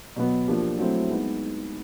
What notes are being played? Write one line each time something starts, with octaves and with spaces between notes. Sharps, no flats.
B2 F#3 B3
F3 A#3 D4 G4
F#3 A3 C4 E4
G#3 B3 D#4